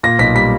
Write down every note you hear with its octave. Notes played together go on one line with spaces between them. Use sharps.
A#2 A#6
B1 B6
G3 B6